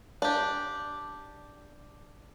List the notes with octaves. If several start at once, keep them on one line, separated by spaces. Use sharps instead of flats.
D4 G4